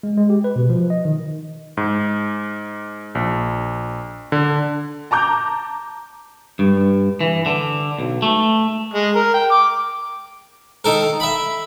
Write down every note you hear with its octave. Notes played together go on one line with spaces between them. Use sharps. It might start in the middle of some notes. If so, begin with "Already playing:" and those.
G#3
G#3
G4
B4
B2
F3
D#5
D#3
G#2
A#1
D3
A5 A#5 D6 G6
G2
E3
D3
B1
A3
G#3
A#4
G5
D6
D#3 A4 A#4
E5 B5